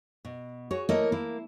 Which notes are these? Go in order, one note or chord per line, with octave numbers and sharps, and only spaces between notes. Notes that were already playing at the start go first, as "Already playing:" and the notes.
B2
F#4 G#4 C#5
A3 A#3 E4 A#4 C#5 D#5
A#3 E4